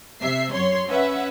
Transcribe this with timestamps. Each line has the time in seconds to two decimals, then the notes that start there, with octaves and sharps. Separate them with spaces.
0.21 C3 E5 C7
0.52 F#2 F#3 C#5 C6
0.87 C#4 B4 E5 F#5